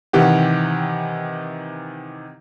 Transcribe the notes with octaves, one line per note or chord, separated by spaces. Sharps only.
C3 D#3 E3 G4 F#5